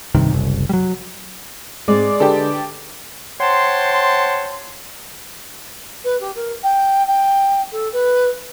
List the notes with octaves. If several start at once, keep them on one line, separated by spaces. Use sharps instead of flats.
C2 G2 C3 D#3
F#1 C2
F#3 G3
G#2 G#3 C4 G#4 D5
D3 D4 G4 A4 B4
C5 C#5 F#5 G5 A5 C6
B4
G4
A#4
G5
G5
A4
B4